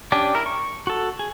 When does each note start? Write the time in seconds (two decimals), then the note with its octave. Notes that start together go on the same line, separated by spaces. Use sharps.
0.12 C#4 D4 G4 D5
0.35 E4 A#4
0.46 C#6
0.87 F#4 A4
1.19 G#4